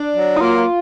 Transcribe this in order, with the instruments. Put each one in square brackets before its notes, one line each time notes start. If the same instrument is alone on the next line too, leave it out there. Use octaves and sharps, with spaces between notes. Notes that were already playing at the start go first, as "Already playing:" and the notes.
Already playing: [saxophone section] D4
F#3
[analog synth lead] D#4
[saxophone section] A#3 [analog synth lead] F4